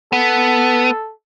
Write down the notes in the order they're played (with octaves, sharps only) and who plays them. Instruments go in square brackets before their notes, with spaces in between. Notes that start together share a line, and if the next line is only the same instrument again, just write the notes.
[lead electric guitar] B3 [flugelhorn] A4